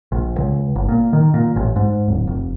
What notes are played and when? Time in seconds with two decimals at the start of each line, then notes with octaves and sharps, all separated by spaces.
0.12 A#1
0.38 C#2
0.76 G1
0.89 A#2
1.13 D#3
1.34 A#2
1.56 A1
1.76 G#2
2.08 D1
2.28 F1